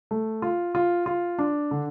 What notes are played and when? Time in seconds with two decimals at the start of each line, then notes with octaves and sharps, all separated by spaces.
0.11 A3
0.42 F4
0.75 F4
1.06 F4
1.39 D4
1.71 D3